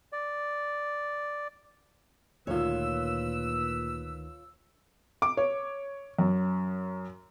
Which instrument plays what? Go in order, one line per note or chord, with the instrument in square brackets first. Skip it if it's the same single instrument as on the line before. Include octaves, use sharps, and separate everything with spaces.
[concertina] D5
[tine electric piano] D2 D#3 [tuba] A#2 [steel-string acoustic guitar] F4 C#5 [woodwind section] B4 E6
[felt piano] D6
C#5
F#2